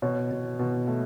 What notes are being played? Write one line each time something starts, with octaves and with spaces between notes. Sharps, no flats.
B2 C#5
B2
B2
A3